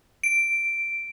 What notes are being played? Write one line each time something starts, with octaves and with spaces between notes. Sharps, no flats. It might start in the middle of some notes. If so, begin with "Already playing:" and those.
D7